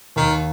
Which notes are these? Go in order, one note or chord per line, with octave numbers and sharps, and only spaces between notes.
D#2 D#3